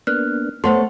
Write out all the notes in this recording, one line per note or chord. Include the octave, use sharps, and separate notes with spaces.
A#3 B3 D4 F6 F#6
A3 B3 A4 C5 C#5 F#5 C6